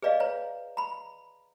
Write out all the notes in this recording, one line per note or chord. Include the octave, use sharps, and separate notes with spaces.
G#4 B4 D5 D#5 F5
B4 C#5 A#5
A#5 B5